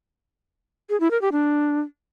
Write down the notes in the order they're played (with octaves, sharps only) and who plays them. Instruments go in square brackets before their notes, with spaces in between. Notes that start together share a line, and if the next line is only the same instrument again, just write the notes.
[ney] G#4
E4
A#4
G4
D4